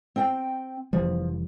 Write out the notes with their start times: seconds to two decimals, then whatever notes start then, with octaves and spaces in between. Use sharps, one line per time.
0.16 C4 G5
0.93 F1 E3 F3 G3